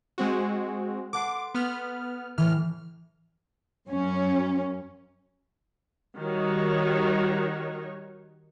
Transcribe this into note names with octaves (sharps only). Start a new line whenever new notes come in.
G#3 C4 F#4
A4 F#5 C6 D6
B3 F6
A2 E3 F6
F#2 C#4
D#3 G3 D#4 F#4 C#5